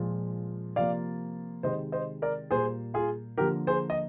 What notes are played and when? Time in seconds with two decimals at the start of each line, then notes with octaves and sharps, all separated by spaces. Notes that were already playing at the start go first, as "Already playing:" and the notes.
Already playing: A#2 F3 G#3
0.76 C3 F3 A#3 D5 F5
1.63 C3 D#3 G#3 C5 D#5
1.92 C5 D#5
2.22 A#4 D5
2.51 A#2 G3 A#3 G#4 C5
2.94 F4 G#4
3.38 D3 F3 A#3 G4 A#4
3.67 G#4 C5
3.90 D#5